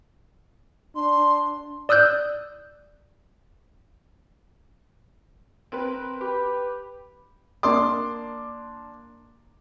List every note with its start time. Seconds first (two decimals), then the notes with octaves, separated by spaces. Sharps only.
0.96 D4 C6
1.89 D5 D#6 E6 F#6 G6
5.72 C4 A#4 B4
6.21 G4 B4
7.63 A#3 D4 C6 D6